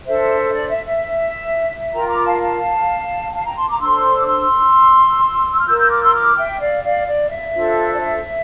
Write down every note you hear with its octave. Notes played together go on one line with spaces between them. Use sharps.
D4 A4 C5 E5
D5
E5
E5
F4 A#4 G5 A#5
A#5 D6
F5 A5
F5 A5
G5
F5 A5
G5 A#5
A5 C6
A#5 D6
D4 A4 C5 C6 E6
D6
C6 E6
E6
F6
F4 A#4 E6 G6
E6 G6
D6 F6
C6 E6
D6 F6
E5 G5
D5 F5
D5 F5
D5
E5
D4 F4 A4 C5
D5
E5